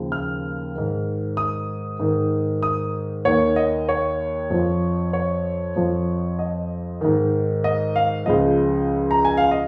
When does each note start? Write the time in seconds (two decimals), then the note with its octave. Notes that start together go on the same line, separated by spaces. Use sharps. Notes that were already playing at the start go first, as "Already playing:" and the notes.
Already playing: D#2 C#3 F3
0.12 F6
0.75 G#2 D#3
1.37 D#6
2.00 G#2 D#3
2.63 D#6
3.25 D#2 D#3 C#5
3.56 D#5
3.89 C#5
4.50 F2 F3
5.13 C#5
5.76 F2 F3
6.39 D#5
7.01 G#2 D#3
7.64 D#5
7.96 F5
8.26 C#2 C#3 F3 D#5
9.11 A#5
9.25 G#5
9.37 F5
9.51 D#5